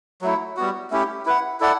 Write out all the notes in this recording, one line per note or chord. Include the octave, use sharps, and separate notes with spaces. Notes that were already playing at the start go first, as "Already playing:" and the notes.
F#3 A3 E4
G3 B3 F#4
A3 C#4 E4 G4
E4 B4 F#5
E4 A4 D5 F#5